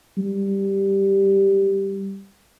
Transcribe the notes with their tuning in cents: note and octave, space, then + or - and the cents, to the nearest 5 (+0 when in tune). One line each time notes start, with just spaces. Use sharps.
G3 +0